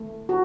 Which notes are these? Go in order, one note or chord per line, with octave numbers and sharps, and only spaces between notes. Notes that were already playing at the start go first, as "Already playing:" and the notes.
Already playing: A3
F#4